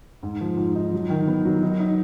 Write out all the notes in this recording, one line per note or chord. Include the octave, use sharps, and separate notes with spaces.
G#2
F3
G#2
D#4
F#3
D#3
B3
F#3
D#4
D#4